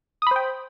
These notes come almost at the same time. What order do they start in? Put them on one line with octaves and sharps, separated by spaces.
D#6 B5 C5 G5